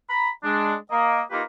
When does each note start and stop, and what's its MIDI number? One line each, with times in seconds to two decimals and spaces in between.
0.09 0.30 82
0.09 0.30 83
0.43 0.74 56
0.43 0.74 62
0.90 1.21 58
0.90 1.21 75
1.31 1.42 58
1.31 1.42 63
1.31 1.42 65
1.31 1.42 67
1.31 1.42 70
1.31 1.42 71